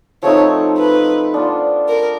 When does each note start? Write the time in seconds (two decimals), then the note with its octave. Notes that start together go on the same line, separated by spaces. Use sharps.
0.23 F3 A3 C4 D#4 C#5
0.78 B4
1.34 B3 D4 F4
1.89 A#4